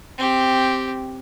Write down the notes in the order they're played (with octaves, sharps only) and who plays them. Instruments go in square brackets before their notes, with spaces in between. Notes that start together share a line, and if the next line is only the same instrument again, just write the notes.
[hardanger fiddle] C4 G4